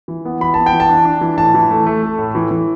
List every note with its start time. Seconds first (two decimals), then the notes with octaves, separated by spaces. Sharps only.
0.08 E3
0.25 B3
0.41 E3 B5
0.54 B3 A5
0.66 G5
0.73 E3
0.80 A5
0.89 D4
1.05 D4
1.21 E3
1.38 A2 A5
1.54 E3
1.71 A3
1.86 A3
2.03 A3
2.18 A2
2.35 E3
2.51 E3